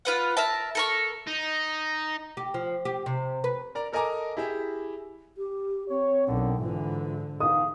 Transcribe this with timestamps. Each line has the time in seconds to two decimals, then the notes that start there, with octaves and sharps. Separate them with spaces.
0.05 F4 B4 F#5
0.37 A#4 E5 A5
0.75 A4 A#4 C#6
1.27 D#4
2.37 G4
2.54 F3
2.85 G4
3.06 C3
3.44 B4
3.75 A#4 D5 A#5
3.93 A4 A#4 D#5 G#5 A#5 D6
4.37 E4 G4 G#4 E5
5.37 G4
5.89 C4 C#5
6.28 B1 D3 D#3
6.60 G#2 D3 E3 F4
7.40 E2 G#3 D#4 F5 D#6